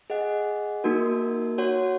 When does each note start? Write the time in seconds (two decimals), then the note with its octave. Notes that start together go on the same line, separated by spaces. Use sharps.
0.10 G#4 D#5 F#5
0.84 A#3 D#4 F#4 A#4
1.58 F#4 C#5 F#5